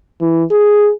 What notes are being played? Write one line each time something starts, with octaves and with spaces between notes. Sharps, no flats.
E3
G#4